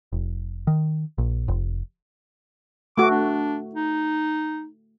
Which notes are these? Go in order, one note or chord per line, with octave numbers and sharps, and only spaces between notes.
F1
D#3
A#1
F1
A3 F#4 D6
D4
D#4